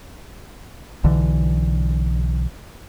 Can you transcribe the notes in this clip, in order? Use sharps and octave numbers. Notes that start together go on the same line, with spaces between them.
B1 D3 E3